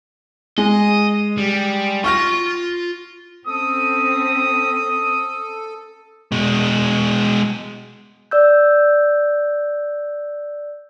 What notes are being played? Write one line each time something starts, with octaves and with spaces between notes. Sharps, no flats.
G#3 D#5
G3
F4 C6 C#6 F6 A#6
C4 C#4 A4 D#6
B2 G#3
D5 E6 G6